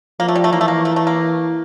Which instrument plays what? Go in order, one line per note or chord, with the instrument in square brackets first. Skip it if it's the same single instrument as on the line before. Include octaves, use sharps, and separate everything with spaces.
[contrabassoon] F3 [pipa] A#3
[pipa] A3
G3
A3
[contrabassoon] E3 [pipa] A#3
[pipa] A3
A#3
A3
A3
A#3